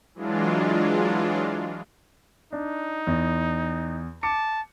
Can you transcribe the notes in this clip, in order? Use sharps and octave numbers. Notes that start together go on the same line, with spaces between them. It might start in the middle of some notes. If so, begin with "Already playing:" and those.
E3 F#3 G#3 D4 F4
D4 D#4
E2
A5 D6 C#7